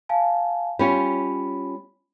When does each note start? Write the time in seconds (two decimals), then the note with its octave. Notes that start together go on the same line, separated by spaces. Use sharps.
0.09 F5 G#5 A5
0.79 G3 C#4 F4 B5